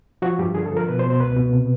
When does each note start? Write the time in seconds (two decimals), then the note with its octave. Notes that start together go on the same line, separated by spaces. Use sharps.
0.22 F3 F#4
0.39 G2 G4
0.55 D3 G#4
0.66 A4
0.71 F3
0.77 A#4
0.87 B2 B4
0.99 C5
1.05 B2
1.10 C5
1.20 C#2 B4
1.36 B2
1.53 C3